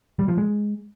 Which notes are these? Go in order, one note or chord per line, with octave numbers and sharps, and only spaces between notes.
G3
F3
G#3